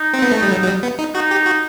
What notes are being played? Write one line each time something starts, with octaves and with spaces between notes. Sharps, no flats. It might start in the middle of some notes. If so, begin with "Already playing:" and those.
Already playing: D#4
C4
B3
A3
G3
F#3
F#3
G3
B3
D#4
D#4 F#4
G4
F#4